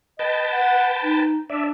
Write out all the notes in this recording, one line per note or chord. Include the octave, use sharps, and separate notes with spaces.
B4 D#5 G5 A5
F#5
D#4
D4 D5 E5